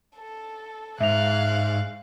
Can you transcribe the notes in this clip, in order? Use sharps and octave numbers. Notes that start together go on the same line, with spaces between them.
A4
G#2 E5 F5 F#6 F7